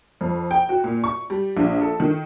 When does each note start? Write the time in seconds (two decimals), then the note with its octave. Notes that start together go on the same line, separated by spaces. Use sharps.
0.21 F2
0.51 G5
0.69 F#4
0.84 A#2
1.04 C#6
1.30 G3
1.57 A#1
1.81 A4
2.00 D#3